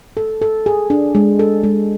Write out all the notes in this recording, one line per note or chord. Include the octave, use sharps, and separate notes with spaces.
A4
A4
G#4
D4
G#3
A4
G#3